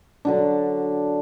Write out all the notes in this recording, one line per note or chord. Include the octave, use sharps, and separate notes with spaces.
D3 F#3 D4